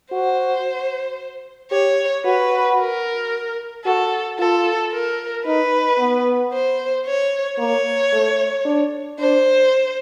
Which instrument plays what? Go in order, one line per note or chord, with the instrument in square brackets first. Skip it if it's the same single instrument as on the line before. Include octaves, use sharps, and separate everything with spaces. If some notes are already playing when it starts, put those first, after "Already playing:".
[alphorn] F#4 [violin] C5
[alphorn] G4 [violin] C#5
[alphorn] F#4 [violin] B4
[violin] A#4
[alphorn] F#4 [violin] A4
[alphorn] F4 [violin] A4
[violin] A#4
[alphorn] D#4 [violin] B4
[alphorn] B3
[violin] C5
C#5
[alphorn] A#3 [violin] C#5
[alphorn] A3
D4
[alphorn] D4 [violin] C5